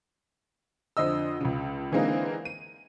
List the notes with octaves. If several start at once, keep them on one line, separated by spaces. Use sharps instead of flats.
F2 D3 C5 D#5 E6
C#2 C#3
D3 E3 G#3 A#3 C4 D#4
D#7